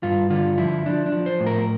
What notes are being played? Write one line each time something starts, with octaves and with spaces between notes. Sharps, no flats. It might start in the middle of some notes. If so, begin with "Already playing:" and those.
G2 F4
D3 F4
F3 E4
F3 D4
D4
F3
C5
A2
A#4